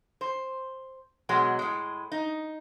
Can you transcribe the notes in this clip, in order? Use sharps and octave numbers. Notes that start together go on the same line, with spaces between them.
C5
B2 F#3 G#3
A2 G#3
D#4